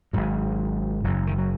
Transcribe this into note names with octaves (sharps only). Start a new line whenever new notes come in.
G#1 G#2 F#3
F#1 F#2 C#3 F#3
D#3
F#3